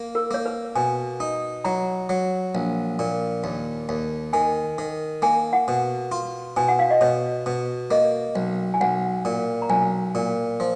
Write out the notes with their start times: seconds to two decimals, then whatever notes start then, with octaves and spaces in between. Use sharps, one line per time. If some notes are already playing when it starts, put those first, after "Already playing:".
Already playing: A#3
0.15 A#4
0.31 A#3 C#5
0.46 B4
0.75 B2 G#5
1.20 D#4
1.64 F#3 A#5
2.09 F#3
2.55 A#1
2.99 A#2
3.44 D#2
3.89 D#2
4.33 D#3 G#5
4.78 D#3
5.22 A#3 G#5
5.53 F#5
5.68 B2
6.12 F4
6.57 B2 G#5
6.68 F#5
6.79 F5
6.90 D#5
7.01 B2 C#5
7.46 B2
7.91 A#3 D#5
8.36 B1
8.74 G#5
8.81 B1 F#5
9.25 A#2
9.62 A#5
9.70 B1 G#5
10.15 A#2
10.60 F3